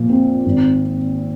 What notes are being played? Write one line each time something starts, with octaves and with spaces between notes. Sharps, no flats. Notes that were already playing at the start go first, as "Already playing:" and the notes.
Already playing: A#2 F3
C4
G#1